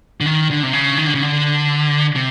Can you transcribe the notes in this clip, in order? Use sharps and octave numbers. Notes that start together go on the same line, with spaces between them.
D3
D#3
D3
C3
C#3
D#3
D3
C#3
D3
C3